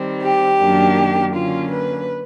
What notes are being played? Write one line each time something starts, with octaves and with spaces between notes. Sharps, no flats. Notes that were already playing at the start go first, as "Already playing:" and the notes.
Already playing: D#3 G3 C4
G4
F#2 D#3 F#3 A#3 D4
D3 F#3 A#3 C#4 F4
B4